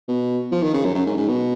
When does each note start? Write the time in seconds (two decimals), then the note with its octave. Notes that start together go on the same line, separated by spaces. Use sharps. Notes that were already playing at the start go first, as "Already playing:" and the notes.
0.09 B2
0.52 F3
0.63 D#3
0.74 C#3
0.85 F#2
0.95 F#2
1.06 G#2
1.17 G#2
1.28 B2